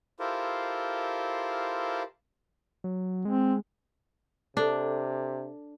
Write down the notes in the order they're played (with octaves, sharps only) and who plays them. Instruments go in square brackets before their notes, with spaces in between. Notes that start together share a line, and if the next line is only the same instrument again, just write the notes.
[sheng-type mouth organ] E4 F4 G4 A4 A#4 C5
[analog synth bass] F#3
[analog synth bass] G#3 [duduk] C4
[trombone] C3 [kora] D4 [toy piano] A4 A5